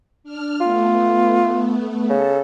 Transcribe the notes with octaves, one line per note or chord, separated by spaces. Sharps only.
D4 F6
A3 B3 F4
C#3 A4